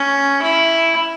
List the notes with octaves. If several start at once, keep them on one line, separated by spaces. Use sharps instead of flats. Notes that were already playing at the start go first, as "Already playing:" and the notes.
Already playing: C#4
E4